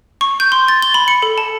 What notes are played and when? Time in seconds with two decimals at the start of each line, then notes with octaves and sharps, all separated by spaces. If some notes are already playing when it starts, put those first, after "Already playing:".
0.21 C#6
0.40 G6
0.52 C6
0.68 A6
0.82 G7
0.94 B5
1.08 C#7
1.22 A4
1.38 A5